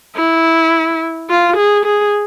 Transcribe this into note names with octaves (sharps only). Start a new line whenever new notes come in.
E4
F4
G#4
G#4